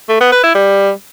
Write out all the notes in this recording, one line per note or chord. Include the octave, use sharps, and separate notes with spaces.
A3
B3
B4
E4
G3